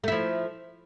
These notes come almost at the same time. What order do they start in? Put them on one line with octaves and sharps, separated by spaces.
A3 E4 F3